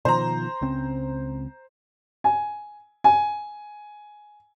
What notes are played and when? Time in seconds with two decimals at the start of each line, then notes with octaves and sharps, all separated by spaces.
0.05 B2 D#3 F3 C5 A#5
0.61 C#2 C#3 C4
2.24 G#5
3.04 G#5